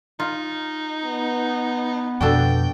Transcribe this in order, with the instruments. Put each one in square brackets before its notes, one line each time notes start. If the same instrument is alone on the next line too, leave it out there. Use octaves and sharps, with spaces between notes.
[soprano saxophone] D#4 [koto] F4
[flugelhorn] B3
[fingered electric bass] F2 B2 [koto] D4 F#4 A4 [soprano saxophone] G5